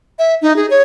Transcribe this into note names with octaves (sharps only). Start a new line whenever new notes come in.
E5
D#4
G#4
C#5